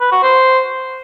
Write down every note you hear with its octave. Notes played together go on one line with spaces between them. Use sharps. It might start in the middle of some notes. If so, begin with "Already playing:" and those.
B4
F#4
C5